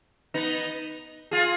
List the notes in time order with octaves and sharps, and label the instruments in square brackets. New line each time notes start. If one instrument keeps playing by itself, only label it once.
[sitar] B3 D#4
F4 G#4